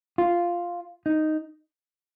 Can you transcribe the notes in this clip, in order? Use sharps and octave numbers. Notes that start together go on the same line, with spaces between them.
F4
D#4